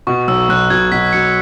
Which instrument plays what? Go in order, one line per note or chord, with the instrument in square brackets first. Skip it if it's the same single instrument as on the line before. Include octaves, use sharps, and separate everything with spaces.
[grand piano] B2 [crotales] C#6
[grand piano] B1 [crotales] E6
[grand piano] B1 [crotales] F#6
[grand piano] B2 [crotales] G#6
[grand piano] B2 [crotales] B6
[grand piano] F#3 [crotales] C#7